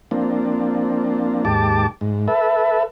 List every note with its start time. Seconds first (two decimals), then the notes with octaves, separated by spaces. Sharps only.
0.11 F3 A#3 C4 D4
1.45 D#2 G#2 G4 A5 D6
2.01 G#2
2.28 A4 B4 E5